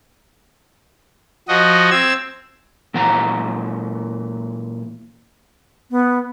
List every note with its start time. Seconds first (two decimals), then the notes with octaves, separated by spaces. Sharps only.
1.49 F3 F#4 D#5
1.90 C4 E6 G#6
2.94 A#2 E3 F#5 A#5
5.91 B3